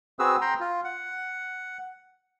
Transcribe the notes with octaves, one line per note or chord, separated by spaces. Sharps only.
C4 F#4 G#4 B4 E6
G5 A#5 C6
F4
F#5